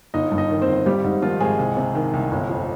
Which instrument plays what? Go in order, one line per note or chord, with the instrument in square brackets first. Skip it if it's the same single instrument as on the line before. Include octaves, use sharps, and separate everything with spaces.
[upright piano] G1 D#4 D#5
G2
D#4 D#5
D#3
C4 C5
G1
G#1 G3 G4
G#2 D#4
D#3 F3 F4
G#1 G#3 G#4
C2
C3
D#3
C2
G1
F2